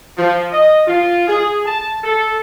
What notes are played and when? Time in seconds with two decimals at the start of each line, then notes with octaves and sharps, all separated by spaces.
0.16 F3
0.51 D#5
0.87 F4
1.27 G#4
1.66 A5
2.03 A4